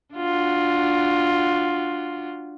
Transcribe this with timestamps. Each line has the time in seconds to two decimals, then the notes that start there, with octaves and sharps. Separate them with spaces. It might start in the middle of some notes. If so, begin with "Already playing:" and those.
0.15 D4 F4 F#4